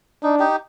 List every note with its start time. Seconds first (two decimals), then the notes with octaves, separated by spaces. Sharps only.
0.23 D4 D#4
0.39 D#4 G4